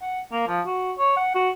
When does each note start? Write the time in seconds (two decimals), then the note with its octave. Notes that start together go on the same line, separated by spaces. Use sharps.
0.02 F#5
0.32 A#3
0.48 F3
0.66 F#4
0.98 C#5
1.17 F#5
1.35 F#4